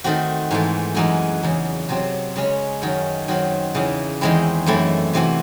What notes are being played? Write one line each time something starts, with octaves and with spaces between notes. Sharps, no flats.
D#3 A3 C4 F#4
G#2 E3 A3
F#2 E3 G#3 D#4 F#4
E2 C#3 F#3
C3 F#3 C4
C#3 G#3 C#4
F#2 D#3 F#3
D#3 F#3 C4 F#4
E2 C#3 E3
E2 D#3 G#3 C4 E4
F#2 E3 A3 C4 E4
C3 E3 C4 F#4